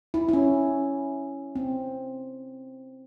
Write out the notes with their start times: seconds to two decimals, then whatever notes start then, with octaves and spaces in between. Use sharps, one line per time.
0.14 E4
0.29 E4
0.33 C#4
1.56 C4